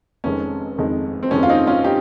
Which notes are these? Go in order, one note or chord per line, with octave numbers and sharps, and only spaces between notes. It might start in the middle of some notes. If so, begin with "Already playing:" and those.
F1 F2 D#3 G#3 C#4
F1 F2 D#3 G#3
C4
F1 F2 D#3 G#3 C#4
F4
C4 D#4
C#4 F4
D#4 G4